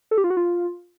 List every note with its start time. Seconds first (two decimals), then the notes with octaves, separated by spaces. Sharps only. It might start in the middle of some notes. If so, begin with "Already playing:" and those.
0.11 A4
0.18 G4
0.24 F4
0.30 F#4
0.37 F4